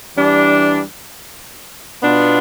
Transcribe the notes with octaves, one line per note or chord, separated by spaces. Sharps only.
E3 G3 D4
B2 B3 D4 F4